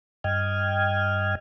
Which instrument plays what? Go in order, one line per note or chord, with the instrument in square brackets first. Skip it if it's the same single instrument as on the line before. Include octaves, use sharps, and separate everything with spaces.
[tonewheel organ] G2 D#5 G5 F6 G#6